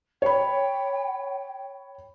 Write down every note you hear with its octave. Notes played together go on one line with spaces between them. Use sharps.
C#5 G5 B5